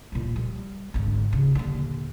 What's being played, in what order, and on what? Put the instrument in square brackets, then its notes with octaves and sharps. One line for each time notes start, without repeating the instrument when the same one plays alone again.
[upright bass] A#2 G3
G3
G#1 D3
C#3
D#1 D3